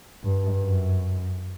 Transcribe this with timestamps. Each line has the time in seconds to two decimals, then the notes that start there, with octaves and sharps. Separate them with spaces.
0.24 G2
0.63 F#2